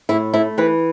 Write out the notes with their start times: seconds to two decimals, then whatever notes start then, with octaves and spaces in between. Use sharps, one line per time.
0.09 A2 E4
0.34 A3 E4
0.58 E3 B4